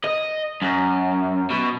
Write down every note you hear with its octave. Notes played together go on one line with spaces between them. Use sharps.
D#5
F#2
B2